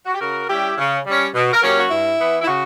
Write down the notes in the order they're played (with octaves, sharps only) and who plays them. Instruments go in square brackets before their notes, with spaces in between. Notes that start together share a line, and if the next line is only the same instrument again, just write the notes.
[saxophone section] F#4
G4
C#3 F#4 A#4
G3 C#4 E4 G4
C#3
G3 C#4
B2
A#4
F#3 A#3 C#4 G4
F#4
G2 E4
E3 B3
E4
C#3 F#4